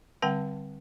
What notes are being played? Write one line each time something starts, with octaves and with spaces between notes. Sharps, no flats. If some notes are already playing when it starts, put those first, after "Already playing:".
D3 G3 C4 F#5 G5 A5